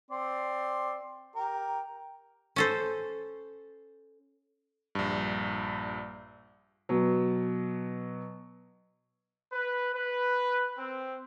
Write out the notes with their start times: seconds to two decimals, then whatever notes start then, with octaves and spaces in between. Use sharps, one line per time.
0.11 C4 D5 C6
1.36 G4 A#4
2.56 C#4 A4 C5
4.95 A#1 G2
6.89 B2 F#3
9.52 B4
9.95 B4
10.78 C4